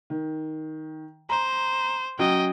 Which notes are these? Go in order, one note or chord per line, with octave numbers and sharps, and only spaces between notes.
D#3
C5 A#5
F#3 C#4 F#4 D#5 G5